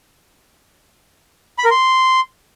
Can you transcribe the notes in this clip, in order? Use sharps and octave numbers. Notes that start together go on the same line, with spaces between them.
B5
A#4
C6